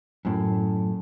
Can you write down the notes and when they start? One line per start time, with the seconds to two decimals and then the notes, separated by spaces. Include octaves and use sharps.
0.25 F#2 A2